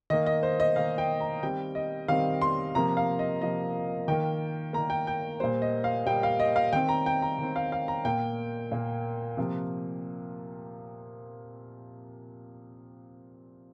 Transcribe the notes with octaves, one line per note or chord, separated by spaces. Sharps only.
D#3 A#3 D#5
D#5
C5
D#5
D#3 A#3 F5
G5
A#5
D#3 G3 C4 G5
D#5
D#3 G3 C4 F5
C6
C3 F3 A#3 A#5
F5
D#5
C3 F3 A#3 D#5
D#3 A#3 G5
D#3 A#3 A#5
G5
G5
A#2 G3 A#3 C5
D#5
F5
A#2 G3 A#3 G5
F5
D#5
F5
D#3 C4 G5
A#5
G5
A#5
D#3 C4
F5
F5
A#5
A#2 A#3 G5
A#2 A#3
C3 F3 A#3